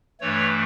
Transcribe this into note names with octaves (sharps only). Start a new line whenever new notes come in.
G2 E3 A3 C#5